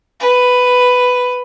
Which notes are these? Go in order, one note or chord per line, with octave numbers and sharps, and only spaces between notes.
B4